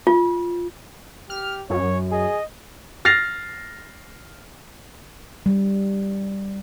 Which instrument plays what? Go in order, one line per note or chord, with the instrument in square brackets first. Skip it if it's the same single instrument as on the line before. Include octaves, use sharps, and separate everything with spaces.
[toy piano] F4
[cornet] G4 [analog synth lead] F6
[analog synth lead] F#2 [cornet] C#5
[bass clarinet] G#4 [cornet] D#5
[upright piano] F6 A6 A#6 C7 F7
[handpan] G3